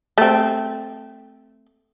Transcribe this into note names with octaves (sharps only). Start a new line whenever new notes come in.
A3 C4